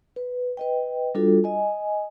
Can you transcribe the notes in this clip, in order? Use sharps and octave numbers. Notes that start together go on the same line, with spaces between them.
B4
B4 D#5 G5
G3 D4 F4 F#4 A4
D#5 G#5